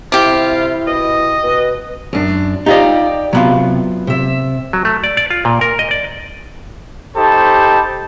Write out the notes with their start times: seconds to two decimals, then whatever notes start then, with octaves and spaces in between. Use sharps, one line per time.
0.12 C3 E4 F4 G4 D6
0.87 B2 D#5
1.44 B2 B4
2.13 F#2 D4
2.66 D#4 F4 G4 D5 D#5
3.33 C3 F#3 B3 F4
4.07 C3 E5
4.73 F#3
4.85 A3
5.04 D5
5.17 D5
5.30 F4
5.45 A#2
5.61 A#4
5.79 D#5
5.91 D5
7.16 D#4 G4 A4 C5 A5 B5